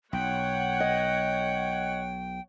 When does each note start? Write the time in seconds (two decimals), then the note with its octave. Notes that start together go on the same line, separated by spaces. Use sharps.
0.13 B1 C#5 F#5 G5
0.80 D#5